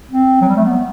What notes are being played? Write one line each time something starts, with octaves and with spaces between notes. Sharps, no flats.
C4
F#3
G3
A3
B3